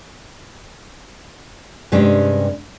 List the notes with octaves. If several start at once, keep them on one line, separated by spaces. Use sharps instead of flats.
G2 C3 G#3 C#4 D4 C5